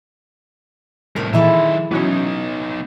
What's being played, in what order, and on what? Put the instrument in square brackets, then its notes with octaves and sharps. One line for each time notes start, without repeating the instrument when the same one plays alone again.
[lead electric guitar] C2 A2 [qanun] A#4 B5
[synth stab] A#2 E3 [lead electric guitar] D#3 E5 [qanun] G#3 E4 A4
[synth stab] E3 F#3 C#4 [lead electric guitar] B3 D#4